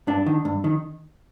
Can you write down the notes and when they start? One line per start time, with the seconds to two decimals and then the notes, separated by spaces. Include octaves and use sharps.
0.07 G2 D4
0.26 D#3
0.45 G2
0.64 D#3